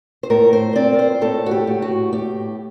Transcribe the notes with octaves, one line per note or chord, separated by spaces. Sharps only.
C5
A2 A#4
C5
C4 D5
A#4
C5
A2 A4
F#4
G4
A2
F#4
A2 G4